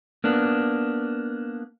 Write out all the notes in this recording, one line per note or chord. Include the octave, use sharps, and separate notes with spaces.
A#3 B3 D4